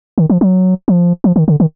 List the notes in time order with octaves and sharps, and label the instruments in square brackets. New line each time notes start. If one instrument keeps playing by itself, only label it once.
[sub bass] D#3
F3
F#3
F3
F3
D#3
D3
D#3